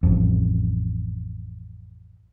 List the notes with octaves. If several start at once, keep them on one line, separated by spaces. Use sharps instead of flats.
A1 F2